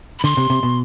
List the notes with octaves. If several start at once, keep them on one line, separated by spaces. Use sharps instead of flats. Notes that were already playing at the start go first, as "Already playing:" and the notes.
B5
D3 C6
C3
C3
B2